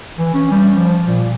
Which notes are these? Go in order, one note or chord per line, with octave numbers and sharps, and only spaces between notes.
E3
C#4
G3
F3
A#2